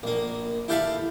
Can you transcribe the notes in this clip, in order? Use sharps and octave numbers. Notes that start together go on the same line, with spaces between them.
A#1 A#3
E4 G4 A4 F5 A5 B5